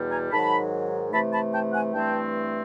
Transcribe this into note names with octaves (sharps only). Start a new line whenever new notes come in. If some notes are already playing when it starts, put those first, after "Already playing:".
Already playing: E2 B2 G3
G#5 A#5
G#2 D#3 F#3 A5 B5
C3 E3 A3 A5 B5
A5 B5
G5 A5
F#5 G#5
G2 E3 A3 C4 G5 A5